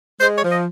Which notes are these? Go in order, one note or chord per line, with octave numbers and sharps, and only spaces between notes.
G#3 C5
C#5
F3
D#5